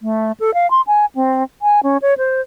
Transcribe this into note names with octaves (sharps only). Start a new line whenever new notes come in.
A3
A4
F5
C6
G#5
C4
G#5
C#4
C#5
C5